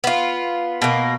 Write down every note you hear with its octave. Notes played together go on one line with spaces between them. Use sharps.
B3 F4
B2 A#3